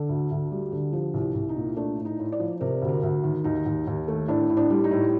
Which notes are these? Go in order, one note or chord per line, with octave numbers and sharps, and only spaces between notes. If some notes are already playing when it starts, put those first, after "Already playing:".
Already playing: D3 A4
D2
D2
G3
D3
F3 G4
C2
G4
C2
D#4
A#2
A3 D4
A2
D#4
A2
D5
F3
C3 A#4
D2
A#4
D2
D#3
D#2 D#4
D#2
D#2
A3
A2 D4
A2
D4
G3
D#4
A2